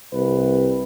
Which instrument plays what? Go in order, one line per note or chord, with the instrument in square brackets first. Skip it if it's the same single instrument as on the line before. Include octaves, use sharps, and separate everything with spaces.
[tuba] C2 [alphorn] B4